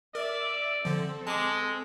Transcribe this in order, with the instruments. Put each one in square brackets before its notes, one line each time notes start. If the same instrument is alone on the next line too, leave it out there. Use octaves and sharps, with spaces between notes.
[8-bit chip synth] A#4 [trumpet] D5 [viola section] E5
[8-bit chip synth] D3 F3 [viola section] C4 A4
[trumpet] G#3 [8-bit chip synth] A5 D6